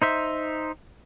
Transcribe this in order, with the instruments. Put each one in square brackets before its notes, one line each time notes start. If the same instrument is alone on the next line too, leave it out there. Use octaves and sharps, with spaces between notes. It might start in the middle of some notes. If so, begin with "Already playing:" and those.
[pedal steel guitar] D#4 C5 E5